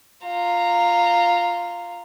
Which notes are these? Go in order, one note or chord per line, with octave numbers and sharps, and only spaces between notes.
F4 A#5